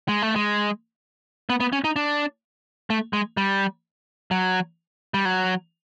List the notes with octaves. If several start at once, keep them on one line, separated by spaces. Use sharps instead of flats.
G#3
A3
G#3
B3
B3
C#4
D#4
D4
A3
G#3
G3
F#3
G3
F#3